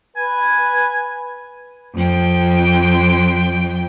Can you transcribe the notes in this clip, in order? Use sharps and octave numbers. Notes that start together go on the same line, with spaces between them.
B4 G#5
F2 G5